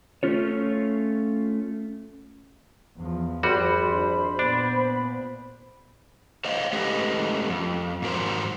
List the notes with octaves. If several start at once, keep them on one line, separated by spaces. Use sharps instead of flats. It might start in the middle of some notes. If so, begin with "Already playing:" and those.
A3 C#4 F4 C#5
E2 F3
G#1 F2 G3 F#4 C5 B5
D4
A#2 B3 D4
C5 C#5 D#5 F5
G#3 A3 C#4 G4 B4 D#5
F2
G#2 F#3 A#4 C5